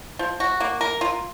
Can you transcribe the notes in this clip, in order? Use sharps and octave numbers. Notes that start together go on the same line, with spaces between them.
F3
F#4
A#3
A#4
F4